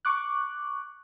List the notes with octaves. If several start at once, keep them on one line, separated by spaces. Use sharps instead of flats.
C#6 D6 F#6